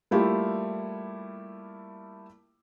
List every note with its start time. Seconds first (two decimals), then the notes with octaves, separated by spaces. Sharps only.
0.11 G3 A3 A#3 E4 F4 G4